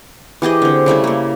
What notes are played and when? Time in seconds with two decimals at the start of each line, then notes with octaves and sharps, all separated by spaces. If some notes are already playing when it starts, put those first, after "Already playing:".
0.42 E3 G4 G#4 D#5
0.62 D3 C4
0.86 C#3 G3 A3 E4
1.04 C#3 A#3